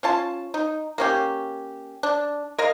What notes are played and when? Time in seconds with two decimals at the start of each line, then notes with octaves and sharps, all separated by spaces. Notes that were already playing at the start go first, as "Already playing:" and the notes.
0.03 C#4 F4 A5
0.54 D#4
0.98 A#3 C#4 G4
2.03 D4
2.58 A#4 D#5 F5